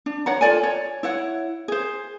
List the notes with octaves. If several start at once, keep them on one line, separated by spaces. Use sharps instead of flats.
D4
C#5 F#5 A#5
F4 A4 D5 G#5
C#5
E4 C#5 F#5
G#4 C5